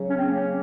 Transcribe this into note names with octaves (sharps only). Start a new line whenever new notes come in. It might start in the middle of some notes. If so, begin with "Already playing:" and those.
Already playing: C#3 F#3
C#4
C4
A#3 C#4